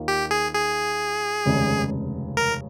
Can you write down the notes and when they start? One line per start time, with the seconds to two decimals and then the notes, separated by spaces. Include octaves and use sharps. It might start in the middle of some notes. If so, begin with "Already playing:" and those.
Already playing: D#2 D#3 A#3 F4
0.08 G4
0.31 G#4
0.54 G#4
1.46 F1 D#2 C#3 G#3
2.37 A#4